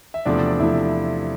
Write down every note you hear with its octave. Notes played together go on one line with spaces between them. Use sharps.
E5
E2 C3 F3 A3 D4 D5
C3 F3 A3 E4 E5